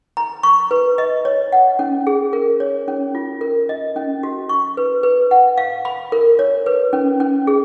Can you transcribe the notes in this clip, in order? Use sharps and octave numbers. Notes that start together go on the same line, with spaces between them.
A#5
C#6
B4
D#5
C#5
F#5
C#4
G#4
A#4
C#5
C#4
F4
A#4
D#5
C#4
F#4
C#6
B4
B4
F#5
F5
B5
A#4
C#5
B4
C#4
C#4
G#4